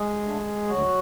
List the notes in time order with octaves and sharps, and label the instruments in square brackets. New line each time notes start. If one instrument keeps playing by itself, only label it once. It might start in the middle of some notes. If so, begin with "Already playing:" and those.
Already playing: [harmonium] G#3 G#4
D3 A3
D2 F#3 F#4